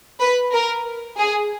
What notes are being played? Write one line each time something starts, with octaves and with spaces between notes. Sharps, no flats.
B4
A#4
G#4